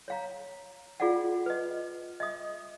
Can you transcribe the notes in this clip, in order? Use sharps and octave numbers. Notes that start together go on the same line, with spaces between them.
C#5 F5 A#5
F4 G#4 D5 F5 F#5
B4 D#5
D#5 E5 D#6